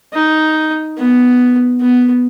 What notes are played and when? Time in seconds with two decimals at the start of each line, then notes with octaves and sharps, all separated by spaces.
0.13 D#4
0.98 B3
1.81 B3